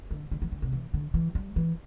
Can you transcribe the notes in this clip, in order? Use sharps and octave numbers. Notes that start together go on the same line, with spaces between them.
D3
D3
E3
D3
C3
E3
D3
E3
G3
E3